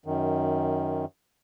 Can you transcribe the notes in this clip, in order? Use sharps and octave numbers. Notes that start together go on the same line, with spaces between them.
F#2 D#3